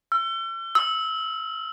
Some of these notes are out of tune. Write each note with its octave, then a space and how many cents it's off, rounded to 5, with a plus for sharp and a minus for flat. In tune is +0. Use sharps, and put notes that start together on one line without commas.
E6 +40
E6 -25